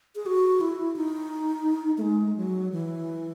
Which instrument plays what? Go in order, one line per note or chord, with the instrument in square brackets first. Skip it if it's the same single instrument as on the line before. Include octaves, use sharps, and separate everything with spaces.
[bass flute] G#4
F#4
E4
D#4
A3
G#3
F#3
E3